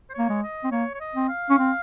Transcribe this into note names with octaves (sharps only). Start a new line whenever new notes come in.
C5
A#3 C#5
G#3
D#5
C4
A#3 C#5
C#5
D#5
C4
F5
C#4
C4